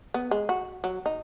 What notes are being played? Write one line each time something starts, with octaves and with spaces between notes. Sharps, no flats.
B3
G#3
F#4
F#3
D#4